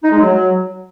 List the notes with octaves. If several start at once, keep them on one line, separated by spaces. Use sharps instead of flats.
D#4
G#3
F#3